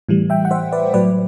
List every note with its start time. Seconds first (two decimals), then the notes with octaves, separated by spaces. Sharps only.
0.09 A2 E3 G3
0.30 E5 G5
0.45 F#5
0.51 C5 E5
0.72 B4 D5
0.94 A2 F#3 B4 D5